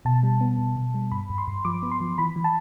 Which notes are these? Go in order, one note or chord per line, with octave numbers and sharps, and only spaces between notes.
B2 A5
G3
B3
B2
B2
G3
G2 B5
G2
C6
G2
F3 D6
B3
C6
F3
E3 B5
E3
A5